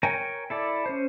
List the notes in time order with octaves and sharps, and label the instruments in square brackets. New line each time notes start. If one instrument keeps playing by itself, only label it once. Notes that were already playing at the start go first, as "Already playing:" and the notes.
[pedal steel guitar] A#4 C#5 G5 G#5 A#5
E4 A4 D5
C#4 C5